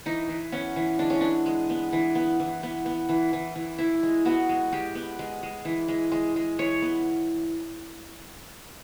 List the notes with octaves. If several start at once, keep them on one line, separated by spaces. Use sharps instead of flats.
E3 D#4
E3
B3 C#4
E3
G#3 D4
C#4
B3 D4
G#3
B3
E3
B3
E3
B3
B3
E3
E3
E3
E3 E4
G#3
B3 F#4
G#3
G#3 G4
B3
G#3
G#3
E3
G#3
G#3
G#3
E3 C#5
B3